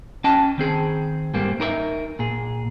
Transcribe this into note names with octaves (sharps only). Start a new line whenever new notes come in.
C#4 D#5 G5 A5
D#3 C4 G#4
G#2 G3 A#3 C4
D#4 A#4 C#5 E5
A#2 G#4